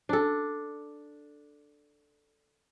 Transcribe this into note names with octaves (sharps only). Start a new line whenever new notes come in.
D4 A4